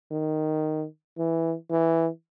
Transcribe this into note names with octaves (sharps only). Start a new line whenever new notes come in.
D#3
E3
E3